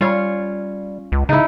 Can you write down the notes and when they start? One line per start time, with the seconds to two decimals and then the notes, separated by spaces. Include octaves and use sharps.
0.01 G3 C#4 F4 C#5
1.12 C#2
1.29 C#3 D#4 E4